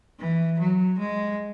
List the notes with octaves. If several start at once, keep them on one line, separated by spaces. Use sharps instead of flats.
E3
F#3
G#3